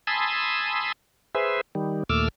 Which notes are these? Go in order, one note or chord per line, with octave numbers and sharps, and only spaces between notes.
G#5 A5 B5 C6 D#6 E6
G#4 B4 C5 E5
D#3 G3
D#2 A#2 A3 D6 E6 F6